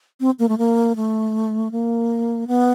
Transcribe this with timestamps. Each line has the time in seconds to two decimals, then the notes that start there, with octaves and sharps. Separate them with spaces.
0.20 C4
0.39 A#3
0.49 A3
0.58 A#3
0.96 A3
1.72 A#3
2.48 B3